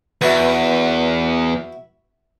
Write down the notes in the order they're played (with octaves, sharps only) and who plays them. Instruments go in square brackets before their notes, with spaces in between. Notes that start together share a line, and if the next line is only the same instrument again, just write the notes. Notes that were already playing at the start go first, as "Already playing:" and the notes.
[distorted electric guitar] E2 [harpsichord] E4 F#4 B4